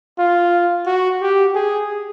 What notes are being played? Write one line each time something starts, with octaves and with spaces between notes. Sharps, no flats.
F4
F#4
G4
G#4